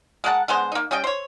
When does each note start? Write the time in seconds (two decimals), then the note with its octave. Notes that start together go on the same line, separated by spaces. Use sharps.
0.24 G#3 A#4 F#5 A5
0.48 D3 G#3 B3 C5
0.72 A#3 D#4
0.91 G3 C#4 D#5 G5
1.04 C5 C#5